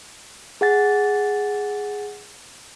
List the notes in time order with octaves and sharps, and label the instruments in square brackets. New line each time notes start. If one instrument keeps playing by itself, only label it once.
[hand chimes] G#4 F#5 A6